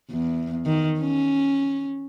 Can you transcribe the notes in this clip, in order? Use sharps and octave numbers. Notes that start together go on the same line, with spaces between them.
E2
D#3
C#4